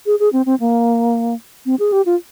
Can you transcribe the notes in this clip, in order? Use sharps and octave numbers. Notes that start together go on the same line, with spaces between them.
G#4
G#4
C4
C4
A#3
C4
G#4
G4
F4